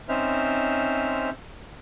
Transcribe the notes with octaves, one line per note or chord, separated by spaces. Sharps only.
C4 C#4 D#4 C5 E5 F6